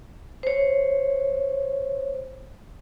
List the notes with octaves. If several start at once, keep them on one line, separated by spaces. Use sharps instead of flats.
C5 C#5